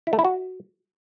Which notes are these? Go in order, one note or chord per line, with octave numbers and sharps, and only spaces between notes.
E4
A3
E4
F#4